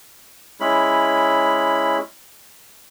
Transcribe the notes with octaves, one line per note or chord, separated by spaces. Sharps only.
G#3 C#4 E4 B5